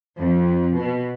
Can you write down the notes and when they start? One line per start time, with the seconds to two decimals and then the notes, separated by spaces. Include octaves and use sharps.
0.17 F2
0.77 B2